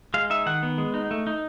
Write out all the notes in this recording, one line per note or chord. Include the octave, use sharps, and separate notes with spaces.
G#3 F5
D#4 E5
D#3 F#5
B3
G#3
D#4
A3
D#4